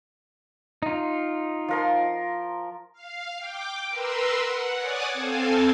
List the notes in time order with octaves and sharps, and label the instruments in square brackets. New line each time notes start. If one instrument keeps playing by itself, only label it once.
[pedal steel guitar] D#4 F4
[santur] F3 A#4 C6
[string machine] F5
G5 D6
A#4 B4 C6 E6
F#5
C#5 D5 F#5 G#5 D6 D#6
C4 A4 F5 G#5 A5